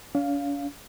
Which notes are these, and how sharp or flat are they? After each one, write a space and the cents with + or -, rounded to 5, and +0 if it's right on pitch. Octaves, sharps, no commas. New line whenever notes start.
C#4 +45 F5 +0